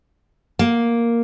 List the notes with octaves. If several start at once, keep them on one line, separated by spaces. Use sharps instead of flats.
A#3